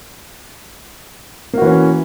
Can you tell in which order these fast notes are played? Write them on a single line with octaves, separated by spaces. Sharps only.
A#3 F#4 E3 C#4